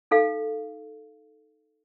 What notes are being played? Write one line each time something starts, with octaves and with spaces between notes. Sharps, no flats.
D#4 A4 F5